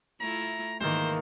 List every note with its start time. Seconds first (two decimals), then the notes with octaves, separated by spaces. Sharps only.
0.21 A3 E4 F4 A#5
0.80 G#2 D#3 E3 A#3 C5 G#5